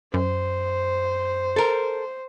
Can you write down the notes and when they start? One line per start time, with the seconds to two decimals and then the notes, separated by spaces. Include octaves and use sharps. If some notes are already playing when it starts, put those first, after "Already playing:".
0.14 F#2 C5
1.56 A4 A#4